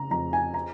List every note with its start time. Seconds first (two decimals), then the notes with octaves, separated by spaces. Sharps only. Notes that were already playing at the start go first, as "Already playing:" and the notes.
Already playing: C#3 A#5
0.11 F2 A#5
0.33 G#5
0.54 A#5